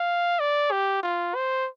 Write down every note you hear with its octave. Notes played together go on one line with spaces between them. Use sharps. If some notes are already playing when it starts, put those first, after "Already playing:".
Already playing: F5
D5
G4
F4
C5